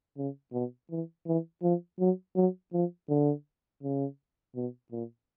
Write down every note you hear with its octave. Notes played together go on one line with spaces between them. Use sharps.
C#3
B2
E3
E3
F3
F#3
F#3
F3
D3
C#3
B2
A#2